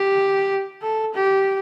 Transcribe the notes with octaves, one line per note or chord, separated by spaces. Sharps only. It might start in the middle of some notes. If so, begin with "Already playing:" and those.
Already playing: G4
A4
G4